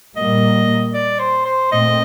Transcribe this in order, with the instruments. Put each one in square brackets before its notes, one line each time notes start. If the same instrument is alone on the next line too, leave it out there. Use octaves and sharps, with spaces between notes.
[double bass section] A#2 G3 A#3 [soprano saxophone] D#5
[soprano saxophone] D5
C5
C5
[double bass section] A#2 A3 C4 [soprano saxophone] D#5